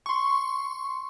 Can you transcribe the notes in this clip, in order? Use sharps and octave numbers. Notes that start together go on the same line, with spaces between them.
C6 C#6